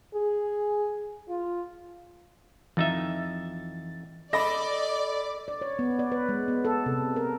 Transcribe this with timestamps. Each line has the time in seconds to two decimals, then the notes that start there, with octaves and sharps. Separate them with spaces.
0.14 G#4
1.29 F4
2.77 F2 E3 D#4 E5 A6
4.33 A4 D5 D#5 B5 D6 A#6
5.48 D5
5.61 C#5
5.79 B3
5.99 D5
6.12 B4
6.29 G#3
6.48 B3
6.65 A4
6.86 C3
7.16 A#4